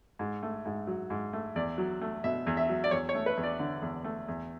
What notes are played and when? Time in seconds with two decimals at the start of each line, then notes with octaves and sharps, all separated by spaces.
0.19 G#2
0.43 A3
0.65 G#2
0.87 F#3
1.10 G#2
1.33 A3
1.56 E2 D5
1.78 F#3
2.01 A3
2.24 B2 E5
2.46 E2
2.57 E5
2.69 F#3
2.84 D5
2.91 E2 C#5
3.09 C#5
3.15 A3
3.26 B4
3.37 E2
3.43 D5
3.59 D3
3.82 E2
4.04 A3
4.28 E2